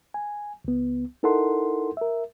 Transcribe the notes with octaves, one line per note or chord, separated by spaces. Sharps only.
G#5
C#2 B3
D#4 E4 A4 A#4 F#5 C6
A#4 E5